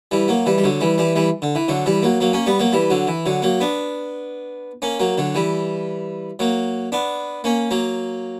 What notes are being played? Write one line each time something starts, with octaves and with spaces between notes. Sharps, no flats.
E3 G3
F#3 A#3
E3 G3
G3
D3 F#3
E3 G3
E3 G3
E3 G3
D3
E3
D3 F#3
E3 G3
F#3 A#3
F#3 A#3
A#3 C#4
G3 B3
F#3 A#3
E3 G3
D3 F#3
E3
D3 F#3
F#3 A#3
B3 D4
A#3 C#4
F#3 A#3
D3 F#3
E3 G3
F#3 A#3
B3 D4
A#3 C#4
F#3 A#3